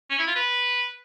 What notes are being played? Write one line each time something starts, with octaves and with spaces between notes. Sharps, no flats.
C#4
E4
F4
B4